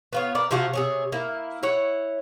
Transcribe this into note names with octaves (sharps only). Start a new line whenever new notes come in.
B3 F4 C#5
A#4 B4 D5
C3 F3 F4 F#4
C3 G#4 C#5
A#3 E4
E4 C#5 F#5